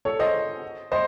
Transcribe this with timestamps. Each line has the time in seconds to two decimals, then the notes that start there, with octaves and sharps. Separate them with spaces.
0.05 A4 C#5
0.19 C5 D#5
0.92 C5 D#5